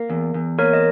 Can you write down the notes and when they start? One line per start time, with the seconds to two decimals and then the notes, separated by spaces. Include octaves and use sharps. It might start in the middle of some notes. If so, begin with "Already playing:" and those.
Already playing: A#3
0.09 E2
0.34 E2
0.59 A#3 A#4 C#5
0.73 D#5